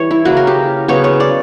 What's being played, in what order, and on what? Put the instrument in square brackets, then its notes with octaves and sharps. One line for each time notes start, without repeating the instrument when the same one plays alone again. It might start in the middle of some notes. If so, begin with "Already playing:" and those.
Already playing: [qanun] E3 G3 C#5
E4
C#3 F#3 A#3 F#4
A#4
G4
C#3 F#3 B3 C#5
C#5
D5